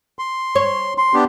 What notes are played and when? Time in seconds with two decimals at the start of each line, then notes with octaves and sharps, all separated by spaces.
0.19 C6
0.55 C#5
0.98 C6
1.14 B3 D4 G4